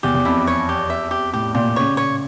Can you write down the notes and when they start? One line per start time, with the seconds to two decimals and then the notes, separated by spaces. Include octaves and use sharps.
0.03 E2 G4
0.15 E2
0.25 F2 E4
0.47 C#5
0.69 G4
0.90 E5
1.11 G4
1.33 A2 G4
1.55 A#2 G4
1.76 C#3 C#5
1.97 C#5